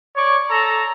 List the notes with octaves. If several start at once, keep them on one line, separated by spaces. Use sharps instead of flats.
C#5 D5 C#6
A4 A#5